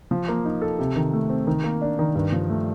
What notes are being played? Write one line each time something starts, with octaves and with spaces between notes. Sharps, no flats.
F3
A#3
D#4
A4
C3
D#3
A3
C4
D#3
A#3
D4
D#3
G2
F3
A3